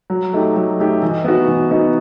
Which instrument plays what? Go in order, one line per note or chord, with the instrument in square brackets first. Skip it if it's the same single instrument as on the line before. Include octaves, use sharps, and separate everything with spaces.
[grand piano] F#3
A3 D#4 G4
F#3
A3 D#4 G4
E3
B3 D#4 F#4
E3
B3 D#4 F#4